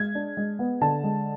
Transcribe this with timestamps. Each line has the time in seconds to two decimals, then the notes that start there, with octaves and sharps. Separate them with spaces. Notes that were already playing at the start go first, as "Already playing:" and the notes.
Already playing: G#3 G#6
0.15 D4
0.37 G#3
0.59 B3
0.81 D3 A5
1.04 G#3